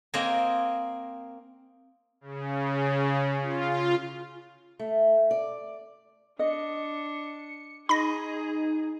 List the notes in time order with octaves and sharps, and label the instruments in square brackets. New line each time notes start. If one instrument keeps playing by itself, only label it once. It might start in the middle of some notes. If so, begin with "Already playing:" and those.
[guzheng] A#3 C4 C5 D#5 G#5
[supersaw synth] C#3
F4
[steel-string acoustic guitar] A3
D5
[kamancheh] D4 [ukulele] D#5 [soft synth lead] C#7
[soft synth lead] D#4 [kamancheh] G#4 [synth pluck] B5 A#6